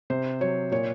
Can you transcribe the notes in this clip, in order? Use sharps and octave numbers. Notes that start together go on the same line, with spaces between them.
C3 C5
F#3 C#5
A#2 C#5